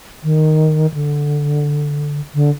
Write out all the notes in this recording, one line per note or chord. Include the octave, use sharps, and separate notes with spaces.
D#3
D3
D3